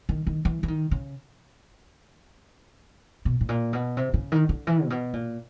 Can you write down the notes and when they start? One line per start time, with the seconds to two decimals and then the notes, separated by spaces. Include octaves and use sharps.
0.09 D#3
0.27 D#3
0.45 E3
0.63 E3
0.68 D#3
0.91 C#3
3.25 B2
3.41 A2
3.49 A#2
3.73 B2
3.97 C3
4.14 C#3
4.32 D#3
4.49 D3
4.67 E3
4.85 A#2
4.90 B2
5.13 A#2